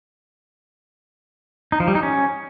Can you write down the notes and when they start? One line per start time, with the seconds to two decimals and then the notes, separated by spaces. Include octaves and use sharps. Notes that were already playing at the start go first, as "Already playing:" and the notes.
1.72 D#4
1.80 F3
1.88 G3
1.95 D#4
2.03 C#4